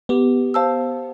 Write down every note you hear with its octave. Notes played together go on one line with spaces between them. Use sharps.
B3 G4
C5 F5 A5 E6